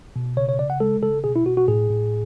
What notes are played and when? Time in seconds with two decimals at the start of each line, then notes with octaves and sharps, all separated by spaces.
0.16 B2
0.37 C#3 C#5
0.49 C#5
0.59 C#3 D5
0.70 F#5
0.80 G#3 A4
1.02 C#3 A4
1.24 B2 G#4
1.36 E4
1.46 B2 F#4
1.57 F#4
1.68 A2 G#4
1.90 A2